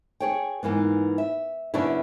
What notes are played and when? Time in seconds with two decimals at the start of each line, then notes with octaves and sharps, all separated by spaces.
0.20 G#4 C#5 G5
0.63 G#2 E3 A#3 B3
1.18 E5
1.74 F#2 C#3 B3 C#4 D4 E4